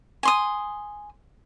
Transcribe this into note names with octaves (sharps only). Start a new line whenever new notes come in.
G#5 C6 D#6